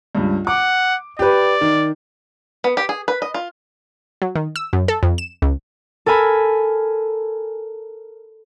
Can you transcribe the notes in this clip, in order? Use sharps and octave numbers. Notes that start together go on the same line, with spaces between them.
C#2 G2
F#5 D6
G4 B4 D5
D#3
B3
G4
G#4
B4
D#5
F4
F#3
D#3
E6
F#2
A4
F2
E7
C#2
A4 A#4 G#5 B5